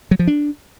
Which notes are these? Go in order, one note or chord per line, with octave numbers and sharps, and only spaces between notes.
F#3
F3
D4